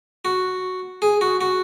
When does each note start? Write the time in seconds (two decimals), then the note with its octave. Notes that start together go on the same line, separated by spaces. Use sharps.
0.25 F#4
1.02 G#4
1.21 F#4
1.41 F#4